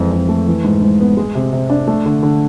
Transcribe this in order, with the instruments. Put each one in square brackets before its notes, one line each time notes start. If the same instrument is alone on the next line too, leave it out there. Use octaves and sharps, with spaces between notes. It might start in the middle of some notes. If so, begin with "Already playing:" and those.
Already playing: [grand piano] F2 E3 G#3
F2
A3
E3
G#2
G#2
B3
G#3
C3
C3
D4
A3
D3
D3